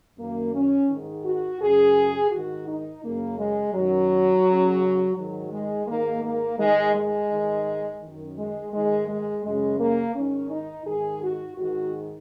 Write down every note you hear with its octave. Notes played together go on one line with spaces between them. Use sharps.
F#2 D#3 A#3
C#4
G#2 D#3
F#4
F#2 C#3 G#4
G#2 D#3 F#4
D#4
F#2 C#3 A#3
G#3
F#2 D#3 F#3
F#2 C#3
G#2 D#3 F#3
G#3
G#2 D#3 A#3
A#3
G#2 D#3 G#3
G#3
G#2 D#3
F#2 D#3
G#3
G#2 D#3 G#3
G#3
F#2 C#3 G#3
A#3
G#2 D#3 C#4
D#4
G#2 D#3 G#4
F#4
G#2 D#3 F#4